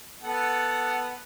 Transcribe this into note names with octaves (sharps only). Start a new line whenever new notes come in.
B3 A4 F#5